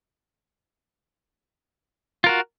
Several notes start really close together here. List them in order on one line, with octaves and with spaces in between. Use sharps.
F4 A#4 F#4